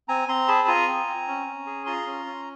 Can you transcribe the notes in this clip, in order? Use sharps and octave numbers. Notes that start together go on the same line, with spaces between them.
C4 G#5 A#5
C4 A#5 C6
G#4 A5 B5
F4 G#5 A#5
C4
C4
C#4
C#4
G#4
F4 A#5 C6
C#4
C#4